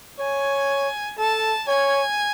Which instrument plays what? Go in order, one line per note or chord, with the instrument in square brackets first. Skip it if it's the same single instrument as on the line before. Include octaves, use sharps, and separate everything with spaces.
[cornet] C#5 [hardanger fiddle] G#5
[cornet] A4 [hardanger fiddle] A5
[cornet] C#5 [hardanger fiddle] G#5